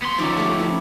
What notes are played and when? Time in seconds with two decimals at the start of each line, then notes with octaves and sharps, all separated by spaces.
0.02 B3 C6
0.18 F3 C#4 D#4 D5 E5
0.37 A3 F4 G4
0.59 E4